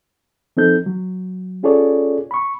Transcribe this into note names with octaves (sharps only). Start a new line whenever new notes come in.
F3 C4 D#4 A4 G6
F#3
C#4 F4 G#4 A4 C#5 D5
B5 C#6